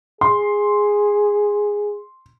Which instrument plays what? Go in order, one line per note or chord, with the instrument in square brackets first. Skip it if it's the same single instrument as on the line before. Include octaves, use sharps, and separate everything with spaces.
[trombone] G#4 [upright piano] C6